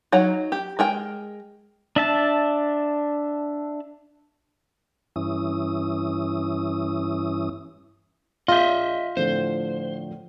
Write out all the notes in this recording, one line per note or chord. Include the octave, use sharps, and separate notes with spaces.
F#3 D#4 C#5 F#5 A#5
G4
G#3 A#4 G5
D4 E5 A5
G2 E3 C#4 E4 D#6
A#1 F4 D#5 E5 G6
A2 D3 F3 C5